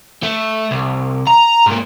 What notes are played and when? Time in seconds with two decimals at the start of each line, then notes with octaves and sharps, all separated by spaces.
0.23 A3
0.71 C2
1.27 A#5
1.66 G#2 A#3